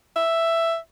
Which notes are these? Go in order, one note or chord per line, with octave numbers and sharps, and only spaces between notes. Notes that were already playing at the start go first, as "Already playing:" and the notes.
E5